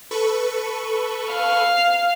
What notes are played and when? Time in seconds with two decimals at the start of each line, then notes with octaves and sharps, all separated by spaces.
0.11 A4 B4 C#6
1.31 F5